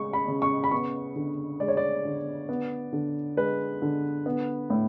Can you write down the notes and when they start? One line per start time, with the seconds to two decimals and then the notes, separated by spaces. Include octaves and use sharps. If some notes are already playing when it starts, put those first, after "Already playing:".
Already playing: C#3 G#3 C#6
0.13 B5
0.28 C#3
0.42 C#6
0.64 B5
0.71 B3 C#6
1.16 D3
1.60 G#3 D5
1.68 C#5
1.77 D5
2.05 D3
2.49 B3
2.93 D3
3.37 G#3 B4
3.82 D3
4.26 B3
4.70 A2